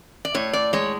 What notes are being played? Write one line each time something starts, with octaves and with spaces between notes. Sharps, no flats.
D5
A2 C#5
D5
G#3 C#5